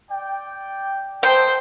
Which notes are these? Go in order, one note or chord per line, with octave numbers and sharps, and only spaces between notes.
D5 G5
D#4 A4 C5 G5